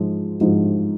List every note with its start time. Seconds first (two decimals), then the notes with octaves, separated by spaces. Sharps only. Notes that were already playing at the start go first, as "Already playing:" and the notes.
Already playing: G#2 F3 G#3
0.41 G#2 F3 G#3